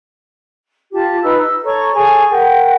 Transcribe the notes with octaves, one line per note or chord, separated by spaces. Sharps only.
F4 G4 A5
D#4 B4 E6
E6
A4 C#5 A#5 C#6
G#4 A4 G#5 C#6
A#4 F#5 G5